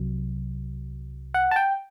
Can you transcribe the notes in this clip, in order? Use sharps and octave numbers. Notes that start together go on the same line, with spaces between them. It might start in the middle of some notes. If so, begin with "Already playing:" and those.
Already playing: C2 C3 F#3
F#5
A5
G5